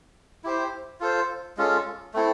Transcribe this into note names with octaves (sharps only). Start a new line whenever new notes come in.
E4 G4 C5
F4 A4 C5
G#3 C#4 F4 A4
A3 C4 E4 A4